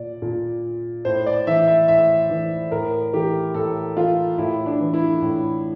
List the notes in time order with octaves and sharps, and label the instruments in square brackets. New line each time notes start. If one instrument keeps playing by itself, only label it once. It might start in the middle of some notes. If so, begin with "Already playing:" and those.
Already playing: [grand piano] A#2 D5
A#2
A2 C5
D5
E3 E5
E5
A2 E5
E3
A2 A#4
E3 G4
A2 A4
E3 F4
A2 E4
D4
E3
E4
A2